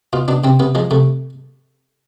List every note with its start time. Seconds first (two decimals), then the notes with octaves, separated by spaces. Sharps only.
0.13 B2 F4
0.28 B2 D4
0.44 C3 C4
0.60 C3 B3
0.75 F3 G#3
0.91 C3 A3